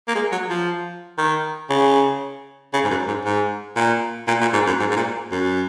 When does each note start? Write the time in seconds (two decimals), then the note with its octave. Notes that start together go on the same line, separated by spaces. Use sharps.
0.08 A#3
0.15 G#3
0.32 F#3
0.49 F3
1.18 D#3
1.70 C#3
2.73 C#3
2.84 G#2
2.90 F#2
3.07 G#2
3.25 G#2
3.76 A#2
4.27 A#2
4.41 A#2
4.53 G#2
4.66 F#2
4.80 G#2
4.91 G#2
4.96 A#2
5.31 F#2